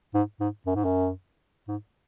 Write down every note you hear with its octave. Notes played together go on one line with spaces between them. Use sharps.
G#2
G#2
F#2
G#2
F#2
G#2